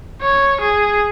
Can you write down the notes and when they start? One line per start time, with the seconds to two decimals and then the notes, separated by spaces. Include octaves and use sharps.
0.21 C#5
0.61 G#4